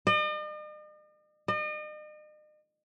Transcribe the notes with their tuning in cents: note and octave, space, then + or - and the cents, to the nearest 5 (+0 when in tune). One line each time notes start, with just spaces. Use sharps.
D#5 -45
D#5 -40